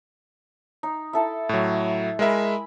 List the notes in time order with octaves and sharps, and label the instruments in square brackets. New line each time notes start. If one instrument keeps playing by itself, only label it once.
[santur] D#4
E4 A4 A5
[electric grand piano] A2 F#3
[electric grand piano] G#3 A#4 E5 [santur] G#5 B5